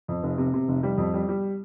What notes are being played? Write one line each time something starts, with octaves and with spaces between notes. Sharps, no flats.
F2
F1
C3
C3
F1
G3
F2
G3
G3